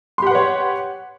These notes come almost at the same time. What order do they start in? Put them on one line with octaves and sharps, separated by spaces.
C6 G4 F#5 B4 C#5